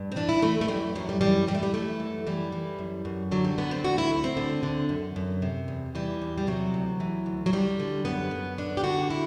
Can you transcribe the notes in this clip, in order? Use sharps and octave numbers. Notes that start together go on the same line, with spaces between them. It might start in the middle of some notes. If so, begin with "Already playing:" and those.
Already playing: G2
C4
E3 D4
E4
E3 A3
A3
F#2 G3
F#2 F#3
G3
E3 G3
E3 G3
A3
G3
F#2 A3
F#2
E3 G3
E3
F#2
F#2
D3 F#3
G3
D3 B3
C4
D2 F#4
E4
D2
C4
D3
D3
F#2
F#2
C3
E2
E3 G3
E2
G3
C3 F#3
D2
E3
D2
F#3
D3 G3
D3
F#2 B3
F#2
D3 D4
G4
D3 F#4
E4